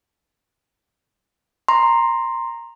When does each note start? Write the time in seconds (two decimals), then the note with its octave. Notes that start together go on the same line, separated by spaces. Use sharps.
1.68 A#5 C6